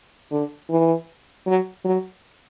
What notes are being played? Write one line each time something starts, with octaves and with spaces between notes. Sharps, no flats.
D3
E3
F#3
F#3